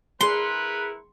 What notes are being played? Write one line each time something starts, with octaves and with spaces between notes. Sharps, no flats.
E4 G#4 A#4 B4 C6 C#7